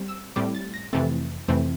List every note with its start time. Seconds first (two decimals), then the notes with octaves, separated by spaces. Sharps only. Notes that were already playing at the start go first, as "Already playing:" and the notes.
Already playing: G3 C4
0.08 E6
0.36 A2 G3 C4 D6
0.55 A6
0.74 A#6
0.93 F2 C3 E3 A3 C4 A6
1.48 F2 C3 E3 A3 C4